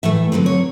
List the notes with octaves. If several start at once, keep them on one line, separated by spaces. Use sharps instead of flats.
A2 E3 A3 E5
D3 F#3 A3 C4
C#5